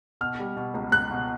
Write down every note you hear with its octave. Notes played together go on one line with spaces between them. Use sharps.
B2 F6
G3
B2
C#2
C#2 F#6
B2